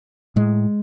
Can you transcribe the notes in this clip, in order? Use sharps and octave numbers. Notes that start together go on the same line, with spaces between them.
A2 G#3